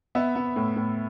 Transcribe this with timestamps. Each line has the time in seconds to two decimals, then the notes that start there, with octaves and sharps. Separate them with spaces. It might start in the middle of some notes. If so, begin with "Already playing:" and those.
0.15 B3 E5
0.35 B3
0.56 A2
0.76 A2